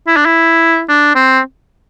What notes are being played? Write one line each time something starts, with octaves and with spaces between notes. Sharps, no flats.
E4
D4
E4
D4
C4